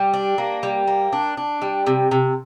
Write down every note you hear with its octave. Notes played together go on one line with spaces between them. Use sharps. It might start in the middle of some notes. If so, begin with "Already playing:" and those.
Already playing: G3
D4
A#3
G3
A#3
D4
D4
G3
C3
C3